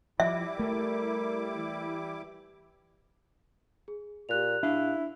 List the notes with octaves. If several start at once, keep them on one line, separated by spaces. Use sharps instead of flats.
F3 G3 E4 E5 D6
A3 A#4
E3
G#4
A#2 G4 F#6 F7
D4 E4 F5